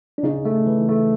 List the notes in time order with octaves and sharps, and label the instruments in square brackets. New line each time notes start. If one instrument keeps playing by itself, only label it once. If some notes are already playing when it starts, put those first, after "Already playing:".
[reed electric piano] D4
[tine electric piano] C#3 [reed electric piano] D#4
[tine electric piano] A3
E3
A3